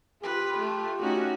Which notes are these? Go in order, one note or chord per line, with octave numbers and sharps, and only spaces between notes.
F4 G4 B4
A3
A3 C#4 D#4 F#4